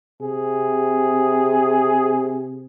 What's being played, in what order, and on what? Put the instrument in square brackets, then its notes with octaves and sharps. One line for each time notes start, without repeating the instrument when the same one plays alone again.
[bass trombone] C3 [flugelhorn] G#4